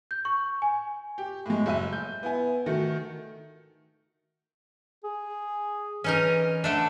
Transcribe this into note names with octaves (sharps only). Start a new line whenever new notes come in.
G6
C#6
G#5
G4
A2 G#3
F#1 E5 D#7
G6
B3 E4 G#5
D#3 A3 F#4
G#4
E3 C#4 D#4 A#4
D3 A3 D4